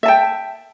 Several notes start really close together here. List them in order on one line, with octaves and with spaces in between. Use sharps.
E5 A5 G5